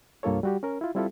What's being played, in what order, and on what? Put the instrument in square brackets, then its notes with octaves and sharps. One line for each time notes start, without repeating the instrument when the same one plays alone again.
[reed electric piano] C2 G2 A#3 F4 A4 C#5
G3 F#4 G4
C#4 A#4
E4 F4
G3 C4 E4 F4 G4 A4